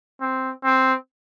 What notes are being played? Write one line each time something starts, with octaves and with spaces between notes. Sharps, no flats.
C4
C4